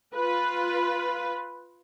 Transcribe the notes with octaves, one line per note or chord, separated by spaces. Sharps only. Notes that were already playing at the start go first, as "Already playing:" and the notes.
F4 B4